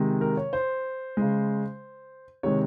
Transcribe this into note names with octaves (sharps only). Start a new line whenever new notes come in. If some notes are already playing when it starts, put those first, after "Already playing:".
Already playing: C3 D#3 G#3
A#4
C#5
C5
C#3 G#3
C3 D#3 G#3 C#5